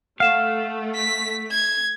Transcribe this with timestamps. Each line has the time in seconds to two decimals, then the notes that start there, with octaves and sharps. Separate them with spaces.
0.20 A3 F5 F#5 E7
0.95 B6
1.51 G#6